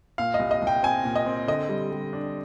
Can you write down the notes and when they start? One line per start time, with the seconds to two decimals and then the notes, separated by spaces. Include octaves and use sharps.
0.18 A#2 F5
0.34 D#5
0.40 C2
0.51 D#5
0.62 C2
0.67 G5
0.83 C4 G#5
1.05 A#2
1.15 D#5
1.26 C4
1.47 D3 D#5
1.69 G3
1.92 G3
2.13 D4